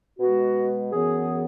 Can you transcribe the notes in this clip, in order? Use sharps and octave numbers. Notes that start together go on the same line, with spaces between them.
B2 G#3 B3 F#4
F#2 E3 B3 G#4